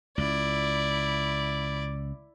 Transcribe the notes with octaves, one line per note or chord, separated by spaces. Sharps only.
C#2 E4 D5